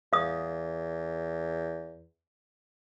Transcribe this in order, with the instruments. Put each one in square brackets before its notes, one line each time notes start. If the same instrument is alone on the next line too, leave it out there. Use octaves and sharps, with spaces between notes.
[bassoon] E2 [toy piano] F5 D#6